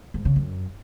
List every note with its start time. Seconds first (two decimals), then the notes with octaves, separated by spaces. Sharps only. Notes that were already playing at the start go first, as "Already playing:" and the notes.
0.14 G#2
0.25 C#3
0.36 F#2